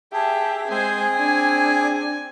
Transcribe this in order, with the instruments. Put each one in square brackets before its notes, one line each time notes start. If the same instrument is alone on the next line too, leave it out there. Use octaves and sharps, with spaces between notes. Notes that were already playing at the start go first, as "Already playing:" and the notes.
[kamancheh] G4 E5 [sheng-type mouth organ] G#4 [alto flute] A5
[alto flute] G#3 [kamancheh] C4 [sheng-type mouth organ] G#4 [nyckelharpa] C5 G#5
[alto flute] D4 [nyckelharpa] G#5